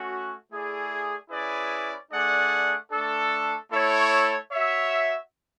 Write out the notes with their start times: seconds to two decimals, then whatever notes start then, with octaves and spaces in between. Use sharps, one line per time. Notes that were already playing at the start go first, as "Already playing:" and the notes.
Already playing: A3 C#4 F#4
0.50 A3 E4 G#4 D5
1.30 C#4 E4 G#4 B4 D5
2.11 A3 D4 G#4 D5 F#5
2.91 A3 D4 A4
3.71 A3 E4 A4 C#5
4.52 F#4 C#5 E5